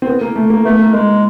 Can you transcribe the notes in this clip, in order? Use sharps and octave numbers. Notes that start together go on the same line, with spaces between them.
C4
B3
A#3
A3
A#3
A3 B3
A#3
G#3 A#3